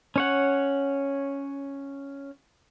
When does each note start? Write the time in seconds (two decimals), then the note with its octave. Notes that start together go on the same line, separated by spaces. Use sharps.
0.16 C#4 C#5 F#5